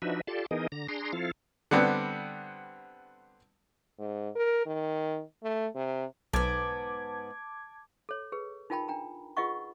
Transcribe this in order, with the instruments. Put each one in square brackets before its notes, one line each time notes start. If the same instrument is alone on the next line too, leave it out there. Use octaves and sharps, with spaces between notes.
[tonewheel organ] F3 D4 D#4 F#4 B4 E5
F4 G4 A4 D5 A5 C6
E3 B3 D#4 G#4 A#4 D#5
D3 A#5
D4 G#4 A#5 C6
F3 C4 E4 F4 A4 F5
[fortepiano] D3 G3 B3 C4
[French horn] G#2
A#4
D#3
A3
C3
[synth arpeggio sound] B1 [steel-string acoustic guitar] G#2 B3 [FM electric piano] A5 D6 G#6
[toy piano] A4 C#5
G#4 B4
D#4 F4 A#4 G5 A5 B5
D4 G5 A#5
F4 G#4 B4 D#5 F#5 C#6